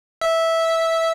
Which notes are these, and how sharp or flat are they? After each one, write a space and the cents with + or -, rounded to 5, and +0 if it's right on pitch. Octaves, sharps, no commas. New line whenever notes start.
E5 -10